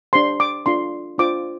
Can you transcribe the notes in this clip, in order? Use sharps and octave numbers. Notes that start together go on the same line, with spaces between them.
D4 G4 C5 C6
D6
D4 F4 A4 C6
D4 F4 C5 D6